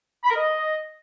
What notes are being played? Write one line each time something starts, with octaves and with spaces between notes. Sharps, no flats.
B5
A#4
D#5